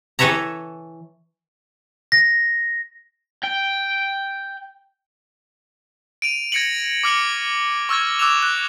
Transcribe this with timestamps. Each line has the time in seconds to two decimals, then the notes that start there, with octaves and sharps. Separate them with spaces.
0.19 E3 A4 B4 C#5 E5 A#5
2.12 A#6
3.43 G5
6.22 D7 D#7 F7
6.52 G#6 A#6 C#7 D7 F#7
7.04 D6 F6 C#7 F#7
7.89 C#6 E6 F6 G#6
8.19 D6 E6 F#6 E7 F7
8.43 F#6